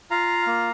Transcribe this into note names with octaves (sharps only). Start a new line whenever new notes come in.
F4 F5 A#5
A#3